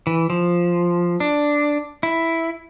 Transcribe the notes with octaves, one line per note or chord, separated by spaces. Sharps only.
E3
F3
D4
E4